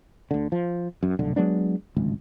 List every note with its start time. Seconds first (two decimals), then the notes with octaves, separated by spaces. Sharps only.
0.31 D2 D3
0.52 F3
1.03 F#2
1.19 F1 B1 D3
1.36 F#3 G#3 B3 D4
1.97 D1 G#1 C#2